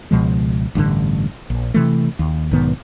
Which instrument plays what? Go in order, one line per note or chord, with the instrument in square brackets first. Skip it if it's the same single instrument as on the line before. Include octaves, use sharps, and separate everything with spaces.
[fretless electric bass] C#2 B2 F3 G#3
A1 G2 B2 D3
A#1
C3 E3 A3
D#2
B1 G#2 D#3 B3